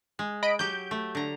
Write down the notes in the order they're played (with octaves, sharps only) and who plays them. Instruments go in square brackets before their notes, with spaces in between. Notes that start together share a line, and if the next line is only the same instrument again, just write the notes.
[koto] G#3
[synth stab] D#5 B5 D7
[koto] F#3 G4 [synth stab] G6
[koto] A3
D3 A#5